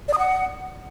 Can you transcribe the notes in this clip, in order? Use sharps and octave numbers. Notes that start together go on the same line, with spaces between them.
D5
D#6
F#5